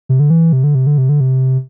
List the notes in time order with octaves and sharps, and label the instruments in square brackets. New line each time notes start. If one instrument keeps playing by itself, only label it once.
[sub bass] C3
D3
E3
C3
D3
C3
D3
C3
D3
C3